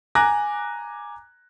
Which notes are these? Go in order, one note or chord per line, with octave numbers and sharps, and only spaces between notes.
G#5 A#5 D6 F#6 A#6